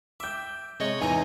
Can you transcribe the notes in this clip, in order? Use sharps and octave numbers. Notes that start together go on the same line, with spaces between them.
E5 G5 D6 G6
C3 G#3 C#5 D#5
E2 E3 D#4 F4 G#5